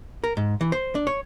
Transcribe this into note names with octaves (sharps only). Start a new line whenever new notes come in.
A#4
G#2
E3
C5
D4
C#5